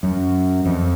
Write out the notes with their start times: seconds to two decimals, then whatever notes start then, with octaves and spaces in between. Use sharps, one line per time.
0.03 F#2
0.65 F2